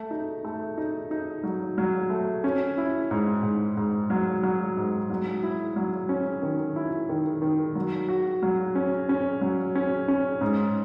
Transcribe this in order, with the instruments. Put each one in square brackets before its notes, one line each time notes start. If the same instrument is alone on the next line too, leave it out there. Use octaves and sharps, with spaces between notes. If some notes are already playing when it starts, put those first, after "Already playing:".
Already playing: [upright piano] A3
D#4
A3
D#4
D#4
F#3
F#3
A3
C#4
E4
G#2
G#2
G#2
F#3
F#3
G#2
F#3
E4
F#3
C#4
D#3
E4
D#3
D#3
F#3
F#4
F#3
C#4
C#4
F#3
C#4
C#4
G#2